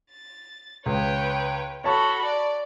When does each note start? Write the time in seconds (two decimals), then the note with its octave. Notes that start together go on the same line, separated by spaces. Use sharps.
0.10 A6
0.86 C#2 B4 C#5 G5
1.84 F#4 A4 C#5 A5 B5 C#6
2.24 D5